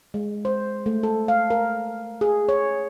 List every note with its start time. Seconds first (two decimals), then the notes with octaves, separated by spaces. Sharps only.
0.14 G#3
0.45 C5
0.86 A3
1.03 A4
1.28 F5
1.50 A#4
2.21 G#4
2.49 C#5